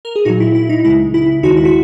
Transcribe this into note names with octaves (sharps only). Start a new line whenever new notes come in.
A#4
G#4
A#2 F#3 D#4 F#4
E4
E4
D#4
C#2 C#3 G#3 E4
E4
D#2 D#3 G#3 D#4 F#4
E4
F#4